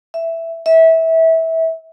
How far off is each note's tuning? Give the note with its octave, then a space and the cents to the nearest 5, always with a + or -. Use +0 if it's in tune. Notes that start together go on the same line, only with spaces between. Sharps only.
E5 +5
E5 -20